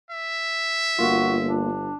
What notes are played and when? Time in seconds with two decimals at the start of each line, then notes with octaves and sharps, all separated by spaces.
0.10 E5
0.99 G1 A#3 F4 F#4
1.47 D4